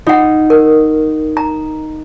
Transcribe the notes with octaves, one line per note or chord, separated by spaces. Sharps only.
D#4 F4 F#5
A#4
A#5